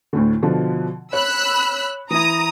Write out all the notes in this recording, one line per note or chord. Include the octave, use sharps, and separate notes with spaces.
D2 A2 D3
B2 D3 F3
C#5 B5 E6 F#6
E3 E4 A#5 D#6